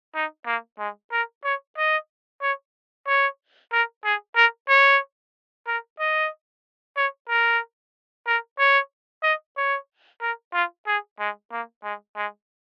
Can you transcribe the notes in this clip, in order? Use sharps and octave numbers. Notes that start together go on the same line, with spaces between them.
D#4
A#3
G#3
A#4
C#5
D#5
C#5
C#5
A#4
G#4
A#4
C#5
A#4
D#5
C#5
A#4
A#4
C#5
D#5
C#5
A#4
F4
G#4
G#3
A#3
G#3
G#3